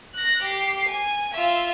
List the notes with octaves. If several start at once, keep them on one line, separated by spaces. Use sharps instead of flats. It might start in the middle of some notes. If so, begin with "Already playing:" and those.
F#6 A#6
G4 C7
G#5
F4 E5